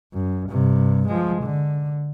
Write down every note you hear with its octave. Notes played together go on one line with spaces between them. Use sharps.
F#2
G2 C3
F3 G#3
D3